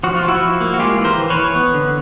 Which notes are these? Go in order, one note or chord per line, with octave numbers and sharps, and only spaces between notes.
F3 F#4
F4
F3
E4 F#4
F3
A#3
F#4
G#3 F4 G4
E3
A#4 C5
E3
B4 C#5
E3
B3
D3